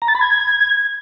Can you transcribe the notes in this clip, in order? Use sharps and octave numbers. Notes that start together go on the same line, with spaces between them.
A#5
A6
B5
G#6